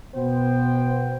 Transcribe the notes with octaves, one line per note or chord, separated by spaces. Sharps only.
B2 B3 C5 G5